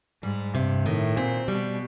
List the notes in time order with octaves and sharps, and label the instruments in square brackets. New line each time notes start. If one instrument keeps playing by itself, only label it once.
[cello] G#2 [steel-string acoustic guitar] G3
[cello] G2 [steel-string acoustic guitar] C3
[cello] A2 [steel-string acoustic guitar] D#3
[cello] A#2 [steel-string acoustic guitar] C4
[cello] B2 [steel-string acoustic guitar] G3